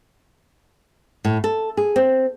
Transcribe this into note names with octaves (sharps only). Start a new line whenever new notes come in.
A2
A4
G#4
C4